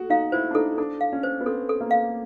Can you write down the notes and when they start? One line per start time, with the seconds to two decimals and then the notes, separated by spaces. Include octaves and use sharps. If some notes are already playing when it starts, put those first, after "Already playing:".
Already playing: F#4 A4
0.10 D#4 F5
0.32 E4 C5
0.51 D4
0.55 D#4 A4
0.78 D4 A4
1.01 F5
1.12 C#4
1.23 C5
1.40 B3
1.46 C4 A4
1.69 A4
1.80 A#3
1.91 F5